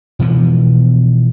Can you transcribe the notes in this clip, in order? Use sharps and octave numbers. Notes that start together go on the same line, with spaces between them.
B2 E3 F3 B3